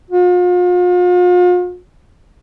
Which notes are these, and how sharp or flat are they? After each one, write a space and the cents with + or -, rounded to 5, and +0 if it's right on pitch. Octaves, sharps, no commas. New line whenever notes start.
F4 +40